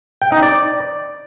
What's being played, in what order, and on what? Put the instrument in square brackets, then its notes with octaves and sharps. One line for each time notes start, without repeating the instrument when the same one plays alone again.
[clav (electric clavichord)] G5
D#4
D5